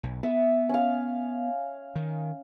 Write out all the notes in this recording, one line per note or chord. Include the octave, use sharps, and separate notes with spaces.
B1
B3 E5
C#4 F5
D#3